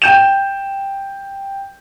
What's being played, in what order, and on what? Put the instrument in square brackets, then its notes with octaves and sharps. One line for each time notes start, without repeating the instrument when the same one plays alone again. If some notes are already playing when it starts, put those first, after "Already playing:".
[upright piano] G5 G6 E7